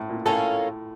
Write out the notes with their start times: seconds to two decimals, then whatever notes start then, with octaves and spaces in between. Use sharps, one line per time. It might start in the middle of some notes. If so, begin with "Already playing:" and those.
Already playing: A2
0.10 A#2
0.26 A2 A#3 C#4 F4 A4